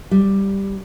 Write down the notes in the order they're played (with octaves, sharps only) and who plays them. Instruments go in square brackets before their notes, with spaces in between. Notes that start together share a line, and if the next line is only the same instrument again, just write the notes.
[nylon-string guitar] G3